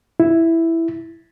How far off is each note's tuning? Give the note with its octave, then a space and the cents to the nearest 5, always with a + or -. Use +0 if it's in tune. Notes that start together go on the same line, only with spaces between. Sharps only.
E4 +0